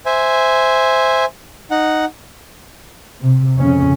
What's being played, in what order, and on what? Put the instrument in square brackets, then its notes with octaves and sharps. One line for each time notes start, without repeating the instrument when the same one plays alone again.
[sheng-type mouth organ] C5 E5 G#5
D#4 F#5
[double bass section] C3
F2 C#3 C#4